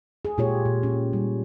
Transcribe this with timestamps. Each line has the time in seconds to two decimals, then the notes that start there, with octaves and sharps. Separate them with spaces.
0.25 G#4
0.38 A#2 G#3 F4 G4 G#4 C#5
0.65 A#2
0.83 C#4
1.13 G3